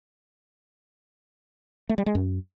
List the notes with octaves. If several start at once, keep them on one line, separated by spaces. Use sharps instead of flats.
A3
G3
G#3
F#2